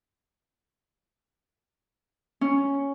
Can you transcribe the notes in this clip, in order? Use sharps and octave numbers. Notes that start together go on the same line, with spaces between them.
C#4